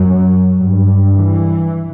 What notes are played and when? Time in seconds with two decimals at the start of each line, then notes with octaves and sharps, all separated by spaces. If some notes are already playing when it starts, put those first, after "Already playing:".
Already playing: F#2 F#3
0.57 G2
1.12 E3